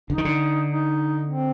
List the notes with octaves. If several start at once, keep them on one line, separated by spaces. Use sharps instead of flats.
D3 D#4
D#3
D3
D#4
C4